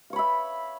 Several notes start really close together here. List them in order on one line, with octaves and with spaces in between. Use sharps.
F5 C#5 B5 E5